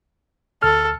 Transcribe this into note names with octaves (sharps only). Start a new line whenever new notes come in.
D2 A4 F6